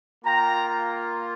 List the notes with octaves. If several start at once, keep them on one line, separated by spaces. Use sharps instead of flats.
A#3 F4 G5 A#5